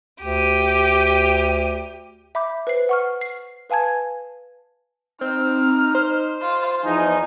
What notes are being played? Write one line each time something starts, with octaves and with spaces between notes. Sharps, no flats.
D2 G4 D#7
E5 B5 D6 G6
B4 C5 C7
F#5 C#6 F6
C7
B4 F5 G#5 A5 G#6
C4 D#4 F6
C5
F4
E2 F3 D#4 G#5